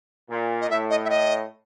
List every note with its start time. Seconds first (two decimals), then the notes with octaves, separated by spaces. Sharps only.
0.30 A#2
0.61 D#5
0.70 A2 E5
0.90 D#5
1.05 E5
1.10 D#5